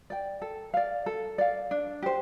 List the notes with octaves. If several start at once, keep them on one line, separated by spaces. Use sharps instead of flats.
D5 G5
A4
D5 F5
A4
D5 F5
D4
G4 C5